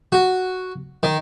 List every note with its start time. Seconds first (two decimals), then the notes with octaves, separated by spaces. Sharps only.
0.12 F#4
1.03 D#3